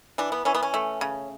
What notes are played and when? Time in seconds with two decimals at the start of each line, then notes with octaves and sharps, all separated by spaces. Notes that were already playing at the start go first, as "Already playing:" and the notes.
0.18 E3 D4
0.32 B3
0.45 E3 C#4
0.55 B3
0.63 C#4
0.74 A3
1.01 C#3